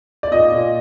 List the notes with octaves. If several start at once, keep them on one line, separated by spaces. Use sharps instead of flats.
D5
A#2 D#5
A#2